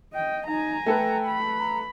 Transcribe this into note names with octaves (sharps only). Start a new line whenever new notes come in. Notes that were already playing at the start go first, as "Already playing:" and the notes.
D#5 G5
D#4 G#5 A#5
A3 A4 B4 G5
B5
A#5